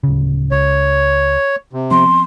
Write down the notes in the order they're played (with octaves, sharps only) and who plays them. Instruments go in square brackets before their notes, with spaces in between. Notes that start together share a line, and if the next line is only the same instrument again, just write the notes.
[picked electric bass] D1 C#3
[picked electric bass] C#2 [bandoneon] C#5
[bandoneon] C3
[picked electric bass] F3 B3 C4 [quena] C6